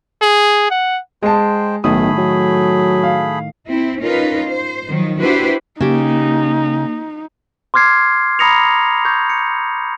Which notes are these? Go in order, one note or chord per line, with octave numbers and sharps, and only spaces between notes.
G#4
F#5
G#3 G#4 C5 G5 A5
B1 A2 D#3 A3 G#4 B5 D#6
F#3
F5
C4 E4
C#4 D#4 F4 A#4 B4
C5
D#3 F3 F#3
D4 E4 F#4 G4 B4 C5
C#3 A#3 D#4 G4
C6 D6 F6 G#6 C7
A#5 B5 D#6 A#6 C#7 F7
C#6 G6 G#6
C#7